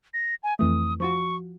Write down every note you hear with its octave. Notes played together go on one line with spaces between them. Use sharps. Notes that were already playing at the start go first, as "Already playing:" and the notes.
A#6
G#5
F2 E3 A3 D#6
F3 F4 F#4 C#6